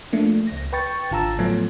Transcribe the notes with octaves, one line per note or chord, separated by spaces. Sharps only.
F3 A3 A#3 D4
C#2 A#6
B4 G5 C#6 A6
G#1 D3 F4 A5 A#5 E6
A2 F3 F#3 A3 B3